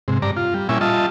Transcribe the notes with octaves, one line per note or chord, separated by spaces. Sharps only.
G#2 C3
G2 D5 A#5
F4
G3
A#2 G3 C#4 E4 E5 G#5
G3 F4 D#5 E5 A5